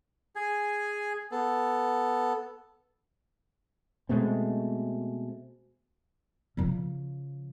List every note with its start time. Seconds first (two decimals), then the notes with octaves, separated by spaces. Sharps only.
0.36 G#4 G#5
1.31 B3 A4
4.09 B2 G#3 A3 C4
6.57 C#3 F3